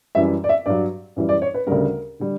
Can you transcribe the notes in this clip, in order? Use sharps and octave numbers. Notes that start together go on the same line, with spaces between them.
F#2 E3 G3 E5
D5
E5
G2 F#3 D5
F#2 E3 G3
D5
C#5
B4
D2 C#3 G3 A#4
D3 G3